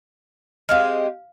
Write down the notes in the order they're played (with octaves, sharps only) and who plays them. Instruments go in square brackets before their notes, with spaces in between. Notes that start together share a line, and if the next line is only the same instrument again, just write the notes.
[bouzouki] G#3 C4 G4 [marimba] F5 F6